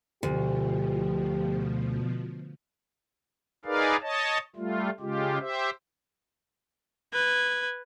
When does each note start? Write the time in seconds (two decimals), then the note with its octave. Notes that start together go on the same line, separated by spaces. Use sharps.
0.23 D2 B2 F3 G4
3.65 D#4 G#4 A#4 B4 D5 F5
4.02 C#5 D#5 A5
4.56 G3 A3 F4
5.00 C#3 G#3 F4 G4
5.40 G4 C5 E5
7.14 B4 G#6